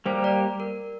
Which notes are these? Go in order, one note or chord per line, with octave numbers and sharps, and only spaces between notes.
G3 A#3 G4 A#4 C5
D5
A#4